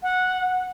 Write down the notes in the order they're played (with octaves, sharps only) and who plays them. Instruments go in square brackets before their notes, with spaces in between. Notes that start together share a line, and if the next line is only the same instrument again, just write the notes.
[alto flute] F#5